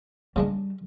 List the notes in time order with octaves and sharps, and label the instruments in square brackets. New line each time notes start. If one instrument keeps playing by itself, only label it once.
[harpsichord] C#3 G#3 D4 [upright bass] G3